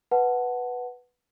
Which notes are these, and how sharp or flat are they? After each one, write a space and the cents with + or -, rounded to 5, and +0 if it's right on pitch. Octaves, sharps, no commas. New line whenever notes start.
B4 +0 F#5 +0 A5 +0